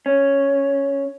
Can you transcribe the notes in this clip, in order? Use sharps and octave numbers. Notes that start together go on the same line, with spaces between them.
C#4